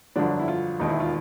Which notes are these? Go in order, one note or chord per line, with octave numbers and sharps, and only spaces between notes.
G1 F2 D3 F#3 D4
E4
F4
E1 D#2 D#3 D#4
E4
F4